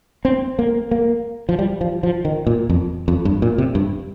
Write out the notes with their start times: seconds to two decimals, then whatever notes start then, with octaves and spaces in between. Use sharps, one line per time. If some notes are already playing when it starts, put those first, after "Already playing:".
0.25 C4
0.59 A#3
0.91 A#3
1.49 F3
1.59 G3
1.81 F3
2.03 F3
2.25 D#3
2.47 A#2
2.70 F2
3.08 F2
3.25 G2
3.42 A#2
3.58 C3
3.75 G2